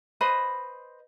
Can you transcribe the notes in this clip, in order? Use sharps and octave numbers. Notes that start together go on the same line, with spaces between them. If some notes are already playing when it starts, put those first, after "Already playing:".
B4 C5 D#5 B5